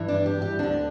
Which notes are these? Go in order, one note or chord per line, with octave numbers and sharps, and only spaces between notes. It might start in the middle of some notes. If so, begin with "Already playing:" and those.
Already playing: G2 E3
D4
G4
G4
D2 D3 D4